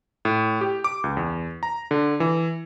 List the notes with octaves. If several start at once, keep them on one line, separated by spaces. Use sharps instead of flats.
A2
G4
D6
C#2
E2
A#5
D3
E3